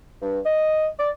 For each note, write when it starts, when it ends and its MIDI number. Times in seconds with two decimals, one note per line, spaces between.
0.22 0.39 43
0.46 0.87 75
0.99 1.10 74